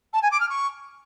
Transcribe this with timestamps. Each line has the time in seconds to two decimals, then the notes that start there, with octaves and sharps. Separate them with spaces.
0.13 A5
0.22 G#5
0.31 D6
0.40 F6
0.49 C#6